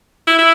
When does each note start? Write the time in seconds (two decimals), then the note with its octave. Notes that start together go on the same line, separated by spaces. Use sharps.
0.28 E4
0.38 E4